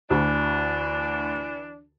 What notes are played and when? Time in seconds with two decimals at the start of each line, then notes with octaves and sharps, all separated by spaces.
0.10 D2 E3 D4